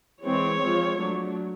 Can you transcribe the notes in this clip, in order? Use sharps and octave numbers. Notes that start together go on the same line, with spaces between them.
E3 G#3 C4 C#5
F3 G#3 C4
F#3 A3 D4